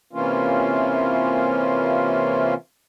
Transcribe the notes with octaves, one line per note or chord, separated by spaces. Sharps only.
C3 E3 A#3 C#4 F4